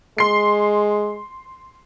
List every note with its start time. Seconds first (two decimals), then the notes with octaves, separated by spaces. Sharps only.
0.18 G#3 C6 C7